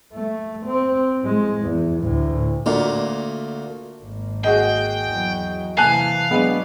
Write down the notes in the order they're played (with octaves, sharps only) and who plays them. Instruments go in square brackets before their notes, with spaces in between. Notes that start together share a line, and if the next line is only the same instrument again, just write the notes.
[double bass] A3
C4
A2 G#3
E2
D2 A2
[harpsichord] D2 A#2
[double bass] G#1 A#3
[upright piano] F#4 G#4 D#5 [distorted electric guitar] G5
[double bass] E2 F#3
[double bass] C3 E3 [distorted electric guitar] F5 [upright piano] G#5 A5 F#6
[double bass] F#3 D4 [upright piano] G#3 B3 B4